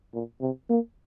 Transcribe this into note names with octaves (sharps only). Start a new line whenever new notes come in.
A#2
C3
A#3